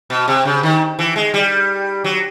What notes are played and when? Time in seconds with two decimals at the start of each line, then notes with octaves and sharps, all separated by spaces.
0.10 B2
0.28 C3
0.45 C#3
0.63 D#3
0.99 E3
1.16 G#3
1.34 G3
2.04 F#3